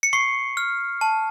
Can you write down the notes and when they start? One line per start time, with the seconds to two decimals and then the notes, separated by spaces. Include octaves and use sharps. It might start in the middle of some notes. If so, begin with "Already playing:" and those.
0.03 C#7
0.13 C#6 C7
0.57 F6
1.01 A5